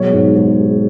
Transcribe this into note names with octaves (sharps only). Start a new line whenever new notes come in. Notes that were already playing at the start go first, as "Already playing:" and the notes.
Already playing: B2 F#3 G#3 C#5
G#2
G#2
G#3